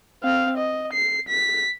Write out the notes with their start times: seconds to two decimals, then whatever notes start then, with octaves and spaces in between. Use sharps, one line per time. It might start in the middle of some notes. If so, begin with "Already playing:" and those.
0.23 C4 F5
0.57 D#5
0.93 C7
1.28 B6